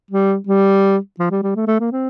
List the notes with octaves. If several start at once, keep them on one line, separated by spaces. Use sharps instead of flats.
G3
G3
F3
G3
G3
A3
A3
A#3
C4